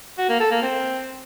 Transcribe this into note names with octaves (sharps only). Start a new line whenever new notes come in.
F#4
A#3
A4
A#3
C4